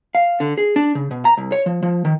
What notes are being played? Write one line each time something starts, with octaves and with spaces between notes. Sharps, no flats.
F5
D3
G#4
D4
C#3
B2
A#5
C2
C#5
F3
F3
D#3